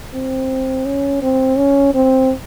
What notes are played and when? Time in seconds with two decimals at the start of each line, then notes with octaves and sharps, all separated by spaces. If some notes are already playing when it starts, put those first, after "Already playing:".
0.14 C4
0.85 C#4
1.22 C4
1.58 C#4
1.94 C4